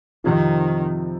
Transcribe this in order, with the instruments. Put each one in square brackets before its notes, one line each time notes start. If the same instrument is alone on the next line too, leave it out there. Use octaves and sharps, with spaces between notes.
[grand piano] F2 C3 F3 [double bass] D#3